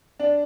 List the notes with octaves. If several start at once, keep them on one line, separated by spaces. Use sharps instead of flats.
D4